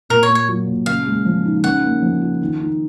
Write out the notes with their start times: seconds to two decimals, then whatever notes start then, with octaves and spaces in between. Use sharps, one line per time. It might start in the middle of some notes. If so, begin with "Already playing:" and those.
0.10 A#2 A#4
0.23 C#5
0.29 A#3
0.35 C#5
0.49 F#3
0.67 A#2
0.86 C#3 F5
1.06 G#3
1.25 F3
1.45 D#4
1.63 C#3 F#5
1.83 A#3
2.02 F3
2.21 F4
2.41 D#3
2.60 D#4